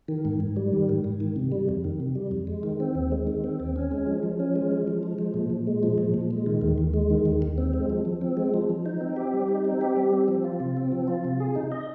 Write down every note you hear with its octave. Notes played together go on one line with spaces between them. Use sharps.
D#3
G#2
G#2
G3
D#3
G#2
G#2
D#3
C3
G3
F2
D#3
C3
G3
F2
G#3
D#3
C4
D#2
G#3
D#3
C4
D#2
C#4
G#3
F3
F3
C#4
G#3
F3
F3
G#3
F3
A#2
A#2
G#3
F3
A#2
A#2
G#3
D#3
D#2
D#2
G#3
D#3
D#2
D#2
C4
G#3
F3
F3
C4
G#3
F3
F3
D#4
C4
G4
G3
D#4
C4
G4
G3
C4
F3
F4
C3
C4
F3
F4
C3
G#4
D#4
D#5